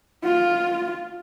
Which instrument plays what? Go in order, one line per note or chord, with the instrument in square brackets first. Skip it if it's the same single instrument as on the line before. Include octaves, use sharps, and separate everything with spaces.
[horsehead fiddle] F4